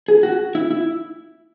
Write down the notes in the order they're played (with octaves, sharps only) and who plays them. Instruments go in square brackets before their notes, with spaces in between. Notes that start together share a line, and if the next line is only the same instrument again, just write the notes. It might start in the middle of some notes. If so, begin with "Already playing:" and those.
[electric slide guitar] G#4
F#4
E4
E4